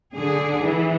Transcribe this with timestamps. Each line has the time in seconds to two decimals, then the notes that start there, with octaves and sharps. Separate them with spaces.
0.13 D3 G#4
0.62 E3